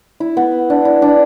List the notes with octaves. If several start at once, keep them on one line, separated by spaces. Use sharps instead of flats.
E4
B3
D4
E4
D4